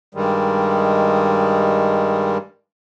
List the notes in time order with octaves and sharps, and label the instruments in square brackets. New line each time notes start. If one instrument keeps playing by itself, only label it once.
[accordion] G2 D#3 G3 G#3